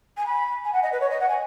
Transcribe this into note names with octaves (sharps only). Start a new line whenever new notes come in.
G#5
B5
G#5
F#5
D#5
B4
C#5
D#5
F#5
G#5